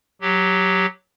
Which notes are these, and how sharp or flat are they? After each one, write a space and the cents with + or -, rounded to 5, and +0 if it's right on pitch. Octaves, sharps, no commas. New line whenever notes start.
F#3 +0 G4 +0